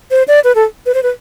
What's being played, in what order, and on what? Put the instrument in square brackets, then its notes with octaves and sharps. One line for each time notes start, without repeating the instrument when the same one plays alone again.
[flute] C5
D5
B4
A4
B4
C5
B4